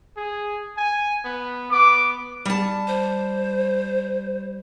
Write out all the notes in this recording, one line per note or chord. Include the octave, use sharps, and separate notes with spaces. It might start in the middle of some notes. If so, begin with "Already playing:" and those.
G#4
G#5
B3
B3 D6
G3 A5
C5